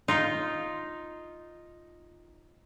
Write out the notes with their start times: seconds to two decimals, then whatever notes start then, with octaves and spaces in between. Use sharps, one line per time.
0.08 D#4 F4